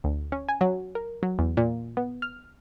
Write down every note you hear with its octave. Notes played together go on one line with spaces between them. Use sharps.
D2
C#4
G#5
F#3
A#4
F#3
E2
A#2
B3
F6